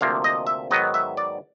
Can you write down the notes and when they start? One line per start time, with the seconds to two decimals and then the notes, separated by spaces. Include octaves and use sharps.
0.01 D2 C3 F3 A#3 F5
0.24 D#5
0.47 E5
0.71 G#2 D#3 F#3 B3 D#5
0.94 E5
1.17 D5